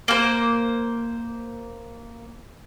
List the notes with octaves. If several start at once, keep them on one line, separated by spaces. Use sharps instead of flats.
A#3 C5